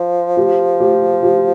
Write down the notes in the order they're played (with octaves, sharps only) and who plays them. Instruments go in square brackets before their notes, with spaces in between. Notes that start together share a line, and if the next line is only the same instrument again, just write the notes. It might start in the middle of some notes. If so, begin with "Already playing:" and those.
Already playing: [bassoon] F3
[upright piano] G4
G4
G4